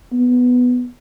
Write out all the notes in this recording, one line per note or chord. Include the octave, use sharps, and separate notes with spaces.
B3